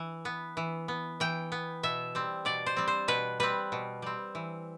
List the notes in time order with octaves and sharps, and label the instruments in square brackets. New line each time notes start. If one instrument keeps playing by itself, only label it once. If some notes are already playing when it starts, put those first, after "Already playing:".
Already playing: [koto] E3
B3
E3
B3
E3 G5
B3
B2 E5
G3 C4
B2 D5
C5
G3 C4
C5
B2 B4
G3 C4 B4
B2
G3 C4
E3